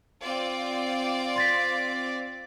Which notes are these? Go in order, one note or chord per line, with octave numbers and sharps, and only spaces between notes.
C4 F4 D5
C6 A6 B6